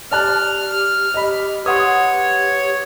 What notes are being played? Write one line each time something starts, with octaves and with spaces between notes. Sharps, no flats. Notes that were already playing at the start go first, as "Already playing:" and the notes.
G4 D5 A5 F6 F#6
G4 D#5 B5
G4 B4 C#5 F#5 C6 D#6